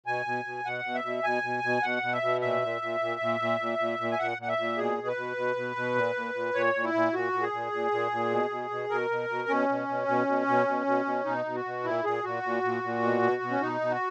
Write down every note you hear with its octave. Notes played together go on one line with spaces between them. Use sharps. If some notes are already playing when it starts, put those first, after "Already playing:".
B2 G#5
B2
B2
B2 F#5
B2
E5
B2
B2 G#5
B2
B2
B2 F#5
B2
E5
B2
A#2 E5
A#2
A#2
A#2
A#2
A#2
A#2
A#2
A#2
G#5
A#2 F#5
A#2 F#5
E5
A#2
B2 G#4
B2
B4
B2
B2
B2
B2
A#2
A#2
A#2
A#2 C#5
A#2
E4
A#2
A#2 F#4
A#2
G#4
A#2
A#2
A#2
A#2
B2
B2
B2
B2 A#4
B2
B2
B2 C#4
B2
B2
B2
B2
B2
B2
B2
B2
B2 D#4
B2
F#4
B2
A#2 E4
A#2 G#4
A#2 F#4
A#2
A#2
A#2
B2
B2
B2
C#4
B2 D#4
B2
F#4